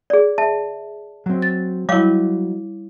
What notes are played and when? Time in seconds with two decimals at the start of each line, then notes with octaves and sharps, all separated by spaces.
0.10 G#4 D5
0.38 E5 A5
1.26 F#3 C4
1.42 A6
1.89 F#3 G3 E4 C#5 D#5 F5 D6